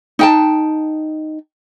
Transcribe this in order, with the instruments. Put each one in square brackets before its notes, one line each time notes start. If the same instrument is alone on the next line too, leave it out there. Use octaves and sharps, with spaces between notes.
[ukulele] D#4 G5 A5